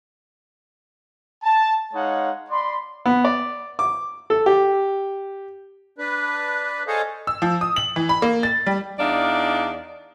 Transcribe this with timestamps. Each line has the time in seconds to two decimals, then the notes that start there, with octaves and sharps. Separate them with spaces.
1.44 A5
1.94 G#3 D#4 C#5 F5 F#5
2.50 D5 B5 C6
3.06 B3
3.25 D5
3.79 D6
4.30 A4
4.46 G4
5.98 D4 B4
6.87 G#4 A4 C5 C#5 D#5 F5
7.27 E6
7.42 F3
7.61 D#6
7.76 F#7
7.96 E3
8.09 B5
8.22 A#3
8.43 A6
8.67 G3
9.00 E2 D4 D#4 D5 F5